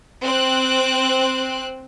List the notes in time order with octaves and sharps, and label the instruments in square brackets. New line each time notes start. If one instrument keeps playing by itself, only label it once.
[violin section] C4 F#6